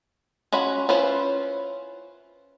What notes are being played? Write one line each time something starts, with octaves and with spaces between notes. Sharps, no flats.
C#4 F4 F#4 B5
C#4 E4 F4 B4 C5